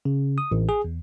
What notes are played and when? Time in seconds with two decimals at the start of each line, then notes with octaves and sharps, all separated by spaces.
0.05 C#3
0.38 D#6
0.51 A1
0.69 G#4
0.84 E2